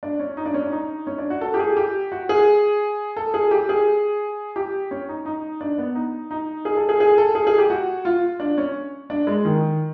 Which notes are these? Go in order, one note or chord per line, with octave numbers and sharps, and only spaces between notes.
D4
C#4
D#4
D4
C#4
D4
D#4
C#4
D4
F#4
A4
G4
G#4
G4
F#4
G#4
A4
G#4
G4
G#4
G4
C#4
D#4
D#4
D4
B3
D#4
D#4
G#4
A4
G#4
G#4
A4
G#4
G#4
G4
F#4
F4
D4
C#4
D4
G#3
D#3